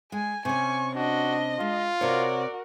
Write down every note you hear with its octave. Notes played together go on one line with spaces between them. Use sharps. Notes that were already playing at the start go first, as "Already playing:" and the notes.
G#3 G#5
C3 C#4 G#5 C#6
D4 F#4 D#5
G#3 F4
C3 F#4 A#4 C#5 D5